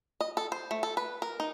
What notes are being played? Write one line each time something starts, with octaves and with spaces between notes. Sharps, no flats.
D#5
A4
C5
A3
A4
B4
A#4
D#4